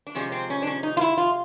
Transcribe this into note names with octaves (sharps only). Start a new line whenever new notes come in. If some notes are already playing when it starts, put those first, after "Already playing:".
D4
C3 F3 G#3 C#4
C4
C#4
D4
C#4
D#4
F4
E4
F4